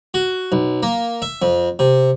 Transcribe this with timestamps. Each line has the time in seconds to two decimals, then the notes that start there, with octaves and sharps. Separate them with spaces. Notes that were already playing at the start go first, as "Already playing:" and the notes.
0.14 F#4
0.52 B1
0.83 A#3
1.22 E5
1.42 F2
1.79 C3